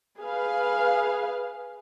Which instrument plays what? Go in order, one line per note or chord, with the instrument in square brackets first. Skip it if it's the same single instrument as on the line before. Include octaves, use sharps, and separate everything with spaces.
[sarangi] G#4 [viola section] B4 F5